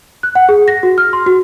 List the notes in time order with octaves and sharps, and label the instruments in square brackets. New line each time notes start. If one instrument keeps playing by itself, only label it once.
[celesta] F#6
F#5
G#4
A#6
F#4
F6
C6
F#4